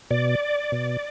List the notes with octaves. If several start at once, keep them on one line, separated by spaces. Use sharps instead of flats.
B2 D5
B2